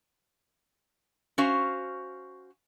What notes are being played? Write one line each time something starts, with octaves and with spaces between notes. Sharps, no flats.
C#4 F#4 C5 F5